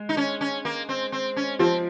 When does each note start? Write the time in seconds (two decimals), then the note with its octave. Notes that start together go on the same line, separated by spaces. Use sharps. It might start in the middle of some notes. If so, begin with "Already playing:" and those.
Already playing: G#3
0.09 D#4
0.17 C#4
0.41 C#4
0.65 A#3
0.89 C4
1.12 C4
1.36 C#4
1.59 F3 C4